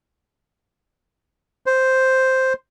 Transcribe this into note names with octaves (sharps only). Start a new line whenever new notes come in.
C5